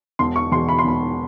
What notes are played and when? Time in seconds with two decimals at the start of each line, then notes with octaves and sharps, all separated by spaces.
0.19 E1 C6
0.36 C#6
0.52 E2 B2 C6
0.69 B5
0.79 C6
0.85 E1 B5